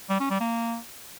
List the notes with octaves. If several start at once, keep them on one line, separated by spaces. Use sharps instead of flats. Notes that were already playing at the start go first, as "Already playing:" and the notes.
G3
C#4
G3
A#3